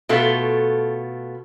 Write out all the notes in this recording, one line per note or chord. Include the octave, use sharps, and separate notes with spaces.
B2 A3 F4 A4